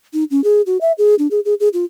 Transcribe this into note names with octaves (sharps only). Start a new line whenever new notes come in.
D#4
C#4
G#4
F#4
E5
G#4
D4
G#4
G#4
G#4
F4